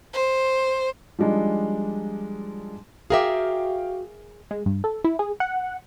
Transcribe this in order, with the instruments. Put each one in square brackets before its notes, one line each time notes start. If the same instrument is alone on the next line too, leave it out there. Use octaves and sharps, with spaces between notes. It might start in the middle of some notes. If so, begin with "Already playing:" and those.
[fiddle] C5
[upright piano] F3 G3 G#3 D4 D#4
[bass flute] F#4 [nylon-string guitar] G#4 A#4 E5 [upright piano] F5 G5 D6
[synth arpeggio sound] G#3
G2
A4
E4
G#4
F#5